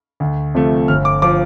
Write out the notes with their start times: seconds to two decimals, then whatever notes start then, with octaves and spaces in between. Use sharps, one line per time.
0.20 D2
0.55 C3 F3 A3
0.88 G1 F6
1.05 D6
1.22 F3 D6